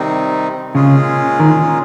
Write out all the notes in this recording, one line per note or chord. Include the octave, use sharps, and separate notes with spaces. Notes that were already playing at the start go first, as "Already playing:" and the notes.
Already playing: C3 D#3 G3 C4 D#4
A#2 C#3 G#3 C#4 F4 G#4
D#3